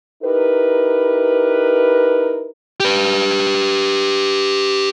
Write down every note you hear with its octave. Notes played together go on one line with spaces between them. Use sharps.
D#4 E4 G4 A#4 B4
G4 B4